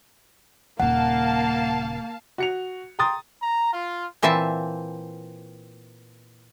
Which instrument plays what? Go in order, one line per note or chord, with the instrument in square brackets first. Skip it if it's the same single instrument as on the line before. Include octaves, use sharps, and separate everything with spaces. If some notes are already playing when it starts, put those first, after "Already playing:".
[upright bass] D#1 C#3 [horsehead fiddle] A#3 [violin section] F5 A5 [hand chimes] F#5
[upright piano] F#4 C#7 F7
G5 A#5 C6 D#6 A6
[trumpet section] A#5
F4
[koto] A#2 E3 C4 E5 A5